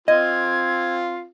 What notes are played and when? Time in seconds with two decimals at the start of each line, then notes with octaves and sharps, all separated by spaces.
0.08 C4 F4 D#5 G#6